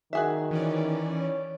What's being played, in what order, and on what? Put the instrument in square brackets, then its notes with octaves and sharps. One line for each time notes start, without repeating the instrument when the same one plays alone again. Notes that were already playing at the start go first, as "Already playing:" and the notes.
[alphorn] D#3 [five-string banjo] F#4 G#4 E5
[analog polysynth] E3 C#4 D5
[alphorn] C#5